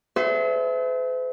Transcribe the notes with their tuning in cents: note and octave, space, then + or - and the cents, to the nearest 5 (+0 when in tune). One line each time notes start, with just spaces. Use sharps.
A4 -45 C5 -45 E5 +0